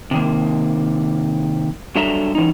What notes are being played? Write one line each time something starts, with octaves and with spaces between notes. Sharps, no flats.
C3 D#3 A#3
G2 F#3 D4 A4 E5 A#5
E3 C#4 D#4